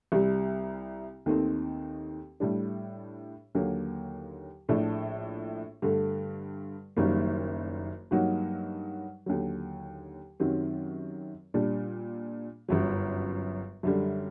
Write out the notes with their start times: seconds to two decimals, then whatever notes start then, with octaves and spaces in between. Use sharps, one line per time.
0.12 C2 C3 G3
1.26 D#2 D#3 A3 C4 D#4
2.40 A2 G3 D4
3.55 D#2 D3 F#3 A#3
4.69 A#1 A2 A3 D4 A4
5.82 G2 D3 A3
6.97 F#1 F#2 D#3 G3 A#3
8.11 G2 F#3 A#3 D#4 F#4
9.26 D#2 D3 F#3
10.40 F#2 D#3 F#3 C4 G4
11.54 A#2 G3 D4
12.68 G1 F#2 F#3
13.83 F#2 D3 G3